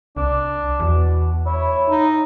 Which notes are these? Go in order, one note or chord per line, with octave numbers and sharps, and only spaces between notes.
C2 D4
E2 B2
E4 C#5
D#4